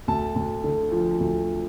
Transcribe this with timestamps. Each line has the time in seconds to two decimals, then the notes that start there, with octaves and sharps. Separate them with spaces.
0.08 D2 A5
0.36 D2
0.64 D3
0.92 F3
1.20 D2